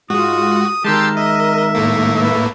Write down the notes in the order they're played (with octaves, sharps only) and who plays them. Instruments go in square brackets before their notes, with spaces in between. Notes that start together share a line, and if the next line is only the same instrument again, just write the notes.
[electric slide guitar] G#2 G#3 [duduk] F4 [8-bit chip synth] F#4 [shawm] D#6
[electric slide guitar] D#3 G#3 [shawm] G4 [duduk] A#4 [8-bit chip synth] A5 C6 E6
[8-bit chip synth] D#5 [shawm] E5
[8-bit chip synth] A2 A3 A#3
[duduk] B4 [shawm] E5